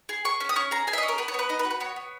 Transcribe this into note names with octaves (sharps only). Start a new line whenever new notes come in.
G#4
G#4 C#6
C#4
D#6
C#4 C#6
G#4 A#5
G#4 G#5
E5
D#5
C#4
A#4
B3 B4
C#5
B3 B4
D#4 D#5
B4
F#4
B4
B3 C#5
B3